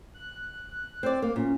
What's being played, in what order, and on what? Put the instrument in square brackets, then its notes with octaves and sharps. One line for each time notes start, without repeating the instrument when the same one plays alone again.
[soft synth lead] F#6
[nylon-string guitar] C4 D5
A#3
[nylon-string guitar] A#2 [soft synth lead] C#4